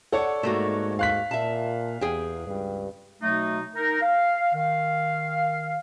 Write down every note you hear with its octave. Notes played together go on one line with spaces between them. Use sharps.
A4 C#5 D5 F#5
G#2 A3 A#3 F#4
F5 F#6 B6
A#2 E5 A5
E2 G#4 G5
C#2 G2
B2 F#3 A3 D#4
D#4 A#4
F5
D#3 F5